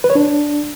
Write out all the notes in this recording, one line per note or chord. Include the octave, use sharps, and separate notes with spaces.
B4
C#5
D4